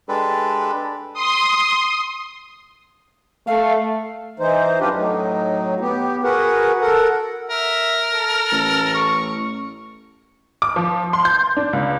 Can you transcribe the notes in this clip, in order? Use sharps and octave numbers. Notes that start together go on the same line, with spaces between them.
G#3 D4 G4 A4 B4
C6 D#6
A3 F5
E3 D#4 C5
F#2 D4 F4 G4 B4
A2 F#3 D#4
B3 G4
F#4 G#4 A#4 B4 F#5
A4 A#4 F#5
A#4 E5
A4
A1
C#6
D6
F3
C6
G6
D4
C#2